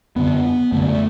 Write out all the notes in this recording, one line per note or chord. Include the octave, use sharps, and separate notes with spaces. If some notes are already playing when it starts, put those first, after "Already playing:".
F#2 D3 B3
F#2 D3 A3
A3